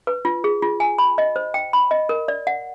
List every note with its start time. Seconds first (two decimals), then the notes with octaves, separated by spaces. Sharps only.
0.07 B4
0.25 F4
0.44 G#4
0.62 F4
0.80 G#5
0.98 B5
1.18 D#5
1.36 C5
1.54 G5
1.73 B5
1.91 D#5
2.09 A#4
2.28 D5
2.47 F#5